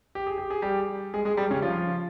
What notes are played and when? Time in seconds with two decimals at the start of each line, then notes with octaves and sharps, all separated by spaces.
0.15 G4
0.27 G#4
0.38 G4
0.50 G#4
0.62 G3 G4
1.14 G#3 G#4
1.25 G#3 G#4
1.37 G3 G4
1.51 C#3 C#4
1.62 F3 F4